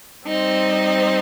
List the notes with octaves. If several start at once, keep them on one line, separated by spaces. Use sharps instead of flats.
G3 C4 D#4 C5